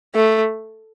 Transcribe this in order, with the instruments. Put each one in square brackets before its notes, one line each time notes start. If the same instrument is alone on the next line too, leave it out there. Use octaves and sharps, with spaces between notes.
[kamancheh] A3